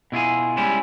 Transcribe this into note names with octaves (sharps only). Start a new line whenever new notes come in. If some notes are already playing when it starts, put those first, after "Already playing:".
B2 E4 F4 G#4
G3 G#3 C#4 E4